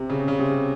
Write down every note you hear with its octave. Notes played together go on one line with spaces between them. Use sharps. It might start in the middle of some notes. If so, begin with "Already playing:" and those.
Already playing: C3
C#3
C#3
C3